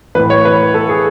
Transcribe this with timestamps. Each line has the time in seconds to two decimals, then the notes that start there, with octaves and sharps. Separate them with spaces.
0.15 A2 E3 B4
0.30 C#5
0.45 B4
0.74 A4
0.89 G#4